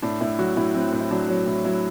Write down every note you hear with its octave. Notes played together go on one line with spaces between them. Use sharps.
A2 D4
A2 E4
F#3 F#4
A2 E4
F#3 C4
A2
E4
F#3 D4
F#3
A2
F#3 E4